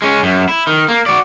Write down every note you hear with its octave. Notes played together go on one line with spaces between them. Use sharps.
G#3 C#4
F#2
E4
D#3
A#3
F#4 D5